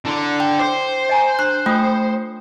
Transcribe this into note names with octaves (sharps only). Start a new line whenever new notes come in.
D3 E4 C6
G5
C5 D6
D#5 G#5 A#5
D4 C6 F#6
A3 F4 G5 D#6